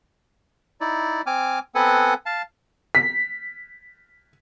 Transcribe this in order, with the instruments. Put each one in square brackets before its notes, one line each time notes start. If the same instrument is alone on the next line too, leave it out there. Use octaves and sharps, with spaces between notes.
[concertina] D#4 E4 D5
C4 G#5 D6 F6
B3 C4 A4 B4 F#5 G#5
F5 A5
[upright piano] B6